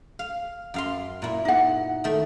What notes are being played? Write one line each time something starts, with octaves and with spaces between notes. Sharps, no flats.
F5
F#2 F5 C6
A#2 E4
D#4 F#5
D#3 A3